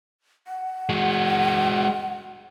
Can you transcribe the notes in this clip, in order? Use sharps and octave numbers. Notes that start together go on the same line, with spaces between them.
F#5
G#3 F#4